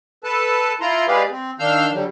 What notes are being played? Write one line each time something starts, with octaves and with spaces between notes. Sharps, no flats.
A4 B4 A5
E4 F4 A#5 C6
G#3 G4 G#4 B4 D5 F5
C4
D#3 D4 F5 E6 F6 G6
D3 F#3 G3